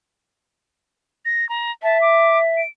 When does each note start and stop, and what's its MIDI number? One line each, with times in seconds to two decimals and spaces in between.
1.25 1.48 94
1.49 1.71 82
1.83 2.61 76
1.83 2.00 81
2.01 2.38 86
2.57 2.68 98